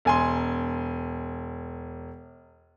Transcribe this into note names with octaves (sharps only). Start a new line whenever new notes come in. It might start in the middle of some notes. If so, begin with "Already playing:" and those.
E1 G#5 C6